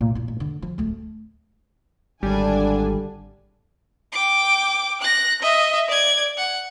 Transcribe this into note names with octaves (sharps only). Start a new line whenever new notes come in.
A2
A#2 E4
A1
D3
F3
D1 A3
G#1 D3 G3 D4 G#5
G5 D6
F#6 A#6
D#5 E5
D5 G#6
F#5